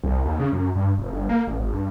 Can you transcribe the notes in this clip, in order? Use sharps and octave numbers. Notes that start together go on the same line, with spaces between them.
C2
D#2
C#3
F#2
G2
F1
G1
A#3
A1
G#1
G2